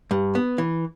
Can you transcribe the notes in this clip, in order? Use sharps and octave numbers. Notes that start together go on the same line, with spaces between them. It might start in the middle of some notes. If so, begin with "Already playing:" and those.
G2
B3
E3